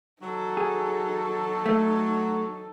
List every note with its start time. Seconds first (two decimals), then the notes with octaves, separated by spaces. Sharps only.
0.22 F#3 D#4 A4
0.57 G#4
1.66 A3